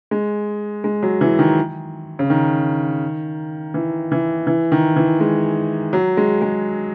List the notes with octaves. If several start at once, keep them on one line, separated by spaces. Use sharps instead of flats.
G#3
G#3
F#3
E3
D#3
C#3
D#3
E3
E3
E3
D#3
E3
G#3
F#3
G#3
G#3